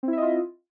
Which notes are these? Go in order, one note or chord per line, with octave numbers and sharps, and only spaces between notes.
C4 E4 F4 D#5 E5